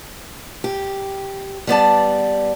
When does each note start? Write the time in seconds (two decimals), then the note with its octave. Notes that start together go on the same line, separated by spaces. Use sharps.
0.64 G4
1.67 G3 B3 D5 A5